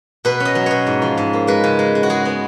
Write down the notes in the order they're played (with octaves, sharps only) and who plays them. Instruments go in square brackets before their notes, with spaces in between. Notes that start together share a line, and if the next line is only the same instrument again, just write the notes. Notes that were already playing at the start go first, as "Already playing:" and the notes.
[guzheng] B2 B4
C#4
D#5
F#3
B2 C#5
G#2
F3
G#2
A#3
G#3 B4
C#3
G#3
G#3
F#4
G#3 G#4
B3